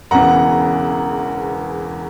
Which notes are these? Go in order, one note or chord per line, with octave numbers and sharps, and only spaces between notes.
E1 E2 C#3 E3 F#5 A#5